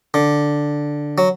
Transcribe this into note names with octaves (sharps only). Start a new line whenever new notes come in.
D3
F#3